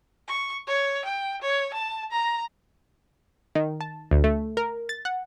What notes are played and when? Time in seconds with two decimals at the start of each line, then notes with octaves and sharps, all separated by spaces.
0.28 C#6
0.67 C#5
1.05 G5
1.42 C#5
1.74 A5
2.12 A#5
3.55 D#3
3.81 A5
4.11 D2
4.24 A3
4.57 A#4
4.89 A6
5.05 F#5